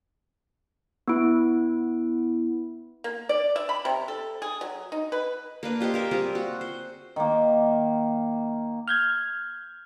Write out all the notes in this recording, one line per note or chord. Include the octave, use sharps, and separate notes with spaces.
B3 E4
A#3
D5
E5
B5
C3
A4
G#4
F#3
D#4
B4
A#3 D4 B4
F4 G4 C5 D#5
G4 A#4 E5
G3 C4 F4 G#4
F#4
C5
D#3 A#3
F6 G6 G#6